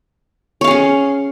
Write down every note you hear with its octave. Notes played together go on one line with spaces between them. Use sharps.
C#4 G#4 C#5 F5